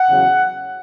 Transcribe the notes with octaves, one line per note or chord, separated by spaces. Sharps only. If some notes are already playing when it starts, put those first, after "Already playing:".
Already playing: F#5
E2 C#3 F#3